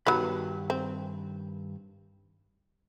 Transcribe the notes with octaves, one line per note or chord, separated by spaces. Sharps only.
G2 D#3 F#3 B3 B5
C4